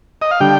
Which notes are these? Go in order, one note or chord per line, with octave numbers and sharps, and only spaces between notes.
D#5
F5
D3 G3 G5